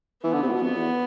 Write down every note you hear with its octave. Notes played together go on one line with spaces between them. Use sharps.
E3 B3
D3
C3
A2
B2
F2 B3
E2